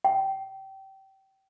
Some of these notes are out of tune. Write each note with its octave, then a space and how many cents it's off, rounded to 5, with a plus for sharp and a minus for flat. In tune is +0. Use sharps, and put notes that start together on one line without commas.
G5 -25